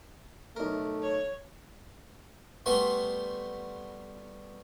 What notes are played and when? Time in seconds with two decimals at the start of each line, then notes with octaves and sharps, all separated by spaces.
0.56 B1 A3 A#4
1.02 C#5
2.66 G3 A3 B3 F#4 C6